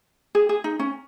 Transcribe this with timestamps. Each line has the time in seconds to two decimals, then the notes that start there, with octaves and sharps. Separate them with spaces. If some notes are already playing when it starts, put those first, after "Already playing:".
0.35 G#4
0.49 G#4
0.64 D#4
0.79 C#4